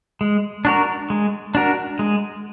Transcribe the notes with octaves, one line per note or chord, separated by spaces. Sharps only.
G#3
D4 F#4 A#4
G#3
D4 F#4 A#4
G#3